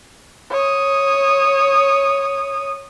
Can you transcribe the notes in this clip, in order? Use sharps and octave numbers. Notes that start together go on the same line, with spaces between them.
C#5 D#6